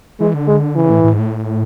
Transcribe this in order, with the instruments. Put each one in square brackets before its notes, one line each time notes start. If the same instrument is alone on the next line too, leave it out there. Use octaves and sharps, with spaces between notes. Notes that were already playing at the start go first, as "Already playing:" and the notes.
[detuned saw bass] E3 [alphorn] G#3
[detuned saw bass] D3
[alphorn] G#3
[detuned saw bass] C#3 [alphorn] E3
[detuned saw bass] A2
A2
G#2
A2